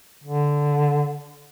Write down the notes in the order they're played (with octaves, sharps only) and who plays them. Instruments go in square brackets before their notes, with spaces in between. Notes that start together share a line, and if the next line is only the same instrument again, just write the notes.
[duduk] D3